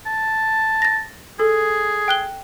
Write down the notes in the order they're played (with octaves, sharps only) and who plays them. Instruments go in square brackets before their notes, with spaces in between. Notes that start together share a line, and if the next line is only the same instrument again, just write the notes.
[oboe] A5
[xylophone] A6 A#6
[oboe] G#4 [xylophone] A4
[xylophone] G5 F#6 G7